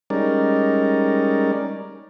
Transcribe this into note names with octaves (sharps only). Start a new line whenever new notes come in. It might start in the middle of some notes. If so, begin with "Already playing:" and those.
G3 G#3 C#4 D#4 A#4 D5